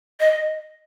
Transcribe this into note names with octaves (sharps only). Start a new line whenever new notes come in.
D#5